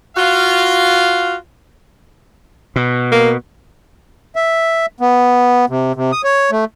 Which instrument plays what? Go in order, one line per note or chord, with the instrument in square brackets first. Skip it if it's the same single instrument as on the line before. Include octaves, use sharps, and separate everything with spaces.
[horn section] F4 F#4 F5
[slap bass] B2
[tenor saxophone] A#3
[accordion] E5
B3
C3
C3
D#6
C#5
A3